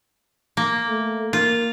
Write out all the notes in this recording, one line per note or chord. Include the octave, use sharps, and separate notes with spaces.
A#3
A3
A#3 F4